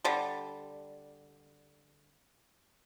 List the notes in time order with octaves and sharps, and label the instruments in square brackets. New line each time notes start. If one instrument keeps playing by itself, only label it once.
[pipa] D3 G3